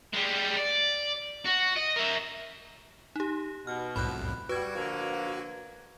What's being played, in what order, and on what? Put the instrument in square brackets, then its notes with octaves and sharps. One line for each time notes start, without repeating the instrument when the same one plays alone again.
[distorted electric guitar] G3 G#3
D5
F#4
D#5
A#4 E5
[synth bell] D#4 G4
[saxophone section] B2 [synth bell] F6
[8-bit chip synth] C2 F2 A2 [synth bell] B5 F#6
[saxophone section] G3 [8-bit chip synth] F#4 [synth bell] B4 G#6
[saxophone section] D3 F3 A#3